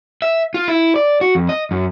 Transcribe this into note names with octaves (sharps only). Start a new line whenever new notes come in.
E5
F4
E4
D5
F#4
F2
D#5
F#2